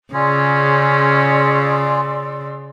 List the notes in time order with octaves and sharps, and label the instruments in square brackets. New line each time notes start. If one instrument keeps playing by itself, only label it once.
[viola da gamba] C#3 [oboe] C#4 [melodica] F4 G#4 [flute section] D5 C6 E6